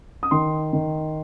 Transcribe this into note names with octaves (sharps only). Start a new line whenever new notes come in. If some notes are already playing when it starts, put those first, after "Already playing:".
D#6
D#3 C6
D#3